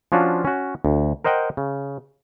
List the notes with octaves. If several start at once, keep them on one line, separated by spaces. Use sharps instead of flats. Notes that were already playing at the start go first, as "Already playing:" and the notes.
F3 C#4 D4 F4 F#4
C#4 F#4
D2
A#4 C5 D#5 F#5 G5
C#3